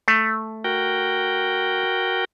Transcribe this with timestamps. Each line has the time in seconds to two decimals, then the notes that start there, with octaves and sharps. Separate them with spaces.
0.08 A3
0.64 F#4 A#4 G5